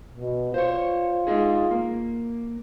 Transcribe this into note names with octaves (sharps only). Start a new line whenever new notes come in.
B2
F4 C5 C#5
D#4 G#4
A#3